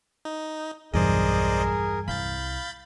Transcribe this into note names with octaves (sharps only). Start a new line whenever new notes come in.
D#4
B1 E2 G2 G#4 A#4 C5 D5 D#5
C2 F5 B5 G6 A6